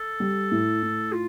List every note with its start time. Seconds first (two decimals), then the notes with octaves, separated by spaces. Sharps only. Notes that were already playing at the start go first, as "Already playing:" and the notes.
Already playing: A4
0.20 G3
0.51 A2
0.83 A2
1.13 F4